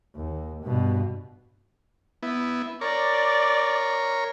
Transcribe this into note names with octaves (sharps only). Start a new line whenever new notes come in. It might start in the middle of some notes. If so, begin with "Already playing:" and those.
D#2
G2 B2
B3 E4
A#4 C#5 D5